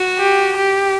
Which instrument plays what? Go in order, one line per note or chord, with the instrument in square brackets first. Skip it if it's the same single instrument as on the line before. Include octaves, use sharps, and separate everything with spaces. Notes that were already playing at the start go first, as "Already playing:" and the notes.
Already playing: [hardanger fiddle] F#4
[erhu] G4
G4